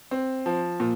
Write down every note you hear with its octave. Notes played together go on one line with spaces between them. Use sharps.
C4
F3
A#2